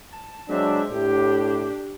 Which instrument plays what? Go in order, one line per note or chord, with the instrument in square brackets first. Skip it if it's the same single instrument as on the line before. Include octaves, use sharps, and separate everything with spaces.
[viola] A5
[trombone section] F#3 G#3 D4 [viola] C4 E5
[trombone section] A2 [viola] D4 G4